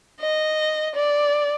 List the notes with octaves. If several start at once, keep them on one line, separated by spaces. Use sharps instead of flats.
D#5
D5